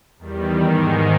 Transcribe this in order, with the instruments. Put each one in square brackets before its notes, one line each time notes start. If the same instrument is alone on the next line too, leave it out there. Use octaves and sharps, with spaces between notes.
[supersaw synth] E2 D#3 G3
G#2 D#3 G#3